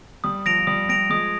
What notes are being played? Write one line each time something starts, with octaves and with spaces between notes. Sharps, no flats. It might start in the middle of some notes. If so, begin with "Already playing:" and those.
G3 D#6
F3 A#6 D7 F7
F3
G3 D#6
G3 A#6 D7 F7
F3 G#3 D#6